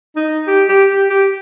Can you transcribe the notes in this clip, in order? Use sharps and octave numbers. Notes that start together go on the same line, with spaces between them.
D#4
G4
G4
G4
G4